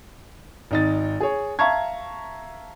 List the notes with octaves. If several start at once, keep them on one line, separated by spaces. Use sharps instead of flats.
G#1 D#4 A6
G#4 C#5
E5 F5 A5 A#5 C#6 G#6